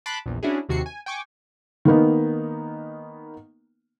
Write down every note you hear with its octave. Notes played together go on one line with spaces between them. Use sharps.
A5 B5 C6 D6 F#6 B6
A#1 E2
C#4 D4 E4 F#4 G#4
D#2 C3 F#4 C7 C#7
G#5
G5 G#5 C#6 D6
D#3 A#3 B3 D#4